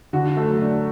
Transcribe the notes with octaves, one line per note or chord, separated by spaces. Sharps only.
D3 F#4
A3
F#3
D4